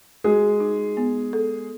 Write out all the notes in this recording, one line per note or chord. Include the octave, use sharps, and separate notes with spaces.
G#3 F#4 G#4
D#4
B3
A4